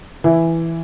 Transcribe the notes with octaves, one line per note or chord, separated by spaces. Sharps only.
E3 E4